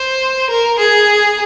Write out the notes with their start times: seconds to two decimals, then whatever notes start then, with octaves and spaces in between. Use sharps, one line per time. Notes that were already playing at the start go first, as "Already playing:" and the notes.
Already playing: C5
0.49 A#4
0.79 G#4